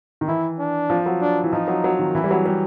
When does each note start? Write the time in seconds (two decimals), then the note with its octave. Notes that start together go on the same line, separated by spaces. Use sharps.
0.21 D#3
0.28 E3 E4
0.59 D4
0.90 F3
1.06 F#3
1.21 D4
1.44 E3
1.52 F3 D#4
1.68 F#3
1.84 F#3
1.99 D#3
2.14 E3 E4
2.24 G3
2.31 F#3
2.46 G3